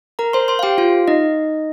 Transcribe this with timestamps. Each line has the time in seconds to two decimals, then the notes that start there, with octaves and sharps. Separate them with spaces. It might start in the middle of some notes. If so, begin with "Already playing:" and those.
0.19 A#4 A#5
0.33 C5 C6
0.48 C5 C6
0.59 F5
0.63 G4 G5
0.78 F4 F5
1.08 D#4 D#5